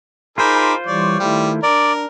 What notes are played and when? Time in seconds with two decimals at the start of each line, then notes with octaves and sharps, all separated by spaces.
0.38 D#4 F4 G#4 A#4 C5 B5 D6
0.87 E3 G3 C#5 D5
1.20 D#3 G3 A3 E4
1.63 D4 A#4 D5